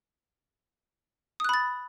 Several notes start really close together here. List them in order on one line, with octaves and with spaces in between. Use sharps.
D#6 F#6 B5 A6